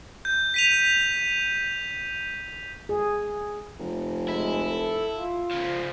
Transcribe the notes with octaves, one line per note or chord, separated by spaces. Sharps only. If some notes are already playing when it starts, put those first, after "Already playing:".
G6
B6 D#7 F7
G#4
F1
G#3 E4
A4
F4
C#3 F3